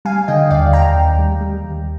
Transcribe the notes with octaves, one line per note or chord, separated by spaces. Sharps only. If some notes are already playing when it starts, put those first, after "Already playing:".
G3 F5 G#5
D3 D#5 G5
D#2 D5 F5
D#2 G5 A#5
D#2
G3
G3
D#2